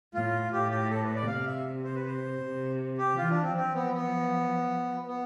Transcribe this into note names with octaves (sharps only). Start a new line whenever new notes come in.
A2 F4
A2 G4
G4
A4
B4
D5
C3 F5
E5
C5
B4
C5
C3
G4
E3 F4
D4
C4
F3 C4
B3
B3
B3